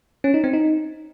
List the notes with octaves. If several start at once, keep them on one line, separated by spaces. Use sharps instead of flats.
C#4
D#4
C4
D#4